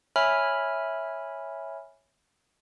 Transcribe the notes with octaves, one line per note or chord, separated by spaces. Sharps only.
C#5 E5 G#5 B5 F6